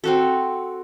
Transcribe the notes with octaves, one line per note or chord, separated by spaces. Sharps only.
C4 F#4 A4